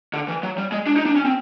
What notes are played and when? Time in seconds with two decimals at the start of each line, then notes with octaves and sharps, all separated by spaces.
0.13 D3
0.28 E3
0.43 F#3
0.58 G3
0.72 G#3
0.87 D4
0.96 D#4
1.06 D4
1.16 C#4
1.25 C4